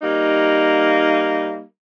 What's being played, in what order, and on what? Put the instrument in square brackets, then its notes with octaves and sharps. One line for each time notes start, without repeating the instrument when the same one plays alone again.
[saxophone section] G3 A#3 D#4